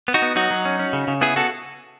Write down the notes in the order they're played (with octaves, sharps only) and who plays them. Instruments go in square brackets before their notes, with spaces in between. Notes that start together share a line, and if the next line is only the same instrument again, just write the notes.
[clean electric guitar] B3
D#4 F#4
B3
F#3 D#4 F#4
F#3
C#4
C#4
C#3
C#3
B3 E4 G#4
B3 F#4 A4